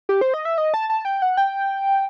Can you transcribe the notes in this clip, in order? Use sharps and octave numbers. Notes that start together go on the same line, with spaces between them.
G4
C5
D#5
E5
D#5
A5
A5
G5
F#5
G5